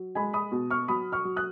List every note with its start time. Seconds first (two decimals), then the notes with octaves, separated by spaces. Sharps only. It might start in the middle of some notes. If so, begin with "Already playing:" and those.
Already playing: F#3
0.15 G#3 G#5 B5
0.33 B5 D#6
0.52 B2
0.70 C#6 F6
0.88 F#3 B5 D#6
1.12 C#6 F6
1.25 F#3
1.36 D#6 F#6